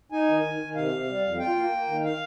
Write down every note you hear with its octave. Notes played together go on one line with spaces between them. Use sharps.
D#4 G#5
D#3
D#3
D#3
C3 F5
C3
G3
F2
F4 G5
A#3
A#3
D#3
F5